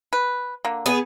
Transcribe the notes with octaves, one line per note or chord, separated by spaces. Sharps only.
B4
D3 A#3
B3 G#4